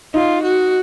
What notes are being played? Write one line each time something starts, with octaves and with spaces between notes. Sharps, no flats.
D#4 F4
F#4